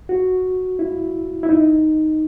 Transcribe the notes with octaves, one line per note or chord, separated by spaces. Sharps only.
F#4
E4
E4
D#4